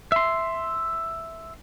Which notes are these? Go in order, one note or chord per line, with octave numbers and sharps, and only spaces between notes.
E5 C6